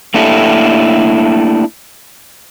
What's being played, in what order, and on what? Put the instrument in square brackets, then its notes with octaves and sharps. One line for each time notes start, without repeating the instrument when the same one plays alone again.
[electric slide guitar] A3 A#3 D4 E4 G4 A4